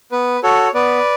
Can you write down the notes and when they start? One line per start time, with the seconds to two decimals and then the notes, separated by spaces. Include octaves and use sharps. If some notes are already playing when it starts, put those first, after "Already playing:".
0.12 B3 B4
0.43 F#4 A4 C#5
0.74 B3 B4 D5